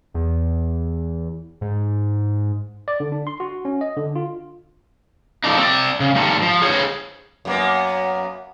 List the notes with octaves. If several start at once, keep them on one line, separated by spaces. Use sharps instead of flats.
E2
G#2
D5
D3
D4
C6
F#4
C#4
D#5
D3
F4
D3 F3 A#3 D4 D#4
C4 C#5 D5
C#3
G2 D#3 G3 A3
F3
G#4 C5 C#5
F#2 A#3 B3